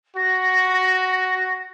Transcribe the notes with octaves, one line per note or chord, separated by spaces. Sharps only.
F#4 A#6